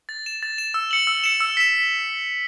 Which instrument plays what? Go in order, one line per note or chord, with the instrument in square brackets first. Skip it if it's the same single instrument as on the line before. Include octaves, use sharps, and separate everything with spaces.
[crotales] A6
E7
A6
E7
E6
C#7 F#7
E6
C#7 E7
E6
B6 E7